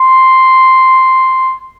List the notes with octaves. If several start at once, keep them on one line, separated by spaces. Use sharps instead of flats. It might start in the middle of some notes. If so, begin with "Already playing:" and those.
Already playing: C6